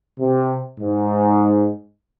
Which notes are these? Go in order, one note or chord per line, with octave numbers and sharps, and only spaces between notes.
C3
G#2